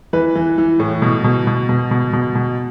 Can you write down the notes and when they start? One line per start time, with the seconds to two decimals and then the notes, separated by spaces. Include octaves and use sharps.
0.13 E3 B4
0.35 E3
0.58 E3
0.79 A2
1.02 B2
1.24 B2
1.47 B2
1.69 B2
1.91 B2
2.13 B2
2.35 B2